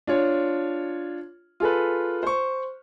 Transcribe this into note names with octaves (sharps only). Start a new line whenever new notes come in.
D4 F4 C#5
F4 G#4 A4 B4
C5 C#6